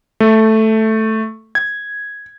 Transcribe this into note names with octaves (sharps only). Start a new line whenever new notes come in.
A3
G#6